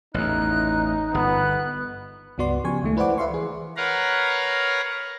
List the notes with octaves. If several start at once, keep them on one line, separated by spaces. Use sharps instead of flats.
A1 E2 D#4 F#6
G1 B3 F#6
C#2 G2 B3 F#4 D5 C6
C#3 F3 G4 G#5 C#6
C#2 D#3 A3
E4 B4 C5 D5 F#5 D6
B4 E5 F5 C6 C#6
E3 G#4
A#4 B4 C#5 F5 F#5 A#5